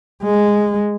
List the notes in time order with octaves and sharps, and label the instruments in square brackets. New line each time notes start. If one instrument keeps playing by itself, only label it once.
[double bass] G#3